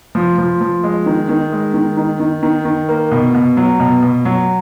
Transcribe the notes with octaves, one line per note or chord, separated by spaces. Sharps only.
F3
F3
F3
G#3
D#3
D#3
G#3
D#3
D#3
D#3
D#3
D#3
A#3
B2
B2
F#3
B2
B2
F#3